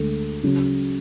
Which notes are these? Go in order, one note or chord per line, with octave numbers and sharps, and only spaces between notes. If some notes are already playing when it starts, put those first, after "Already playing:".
Already playing: D2 D3 G#3 A4
C#3 F#3